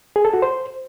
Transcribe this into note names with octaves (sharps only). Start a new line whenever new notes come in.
G#4
A4
F#4
C5